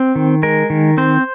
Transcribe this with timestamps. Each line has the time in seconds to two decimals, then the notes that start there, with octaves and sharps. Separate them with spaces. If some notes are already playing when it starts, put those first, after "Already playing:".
Already playing: C4
0.15 D#3
0.43 G#3 A#4
0.70 D#3
0.98 C4 C5